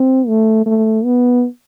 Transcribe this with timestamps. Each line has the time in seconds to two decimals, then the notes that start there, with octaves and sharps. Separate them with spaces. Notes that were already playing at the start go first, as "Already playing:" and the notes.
Already playing: C4
0.27 A3
0.66 A3
1.05 B3